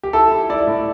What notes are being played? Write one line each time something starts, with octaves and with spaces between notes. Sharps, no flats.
G4
E4 A4
E4
E4 D5
A2